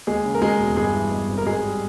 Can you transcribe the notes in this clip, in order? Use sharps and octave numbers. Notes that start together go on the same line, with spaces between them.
D#2 G#3 G#4
C#3
A#4
G#3 G#4
E1
G2 G#3 G#4
E3
G#3
G#1
A#4
G#2 G#3 G#4
G3